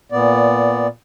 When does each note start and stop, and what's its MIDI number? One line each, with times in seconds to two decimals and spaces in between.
0.12 0.88 46
0.12 0.88 59
0.12 0.88 74